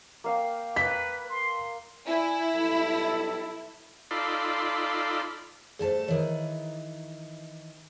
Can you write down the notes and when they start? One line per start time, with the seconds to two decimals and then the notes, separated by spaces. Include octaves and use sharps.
0.24 A#3 F5 G5
0.76 B4 B6
1.29 C6
2.07 E4 D5 E5 G#5
2.54 B1 G3 A4
4.11 D#4 F4 A4 D5 B5 C6
5.79 G2 A3 G#4 C5 A5
6.08 D#3 E3 C#5